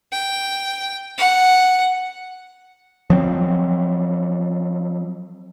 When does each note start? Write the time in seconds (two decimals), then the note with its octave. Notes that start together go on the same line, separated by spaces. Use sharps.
0.12 G5
1.18 F#5
3.10 F3 F#3 C4